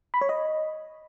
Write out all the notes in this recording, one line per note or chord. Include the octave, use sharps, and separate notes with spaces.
B5
C#5
D#5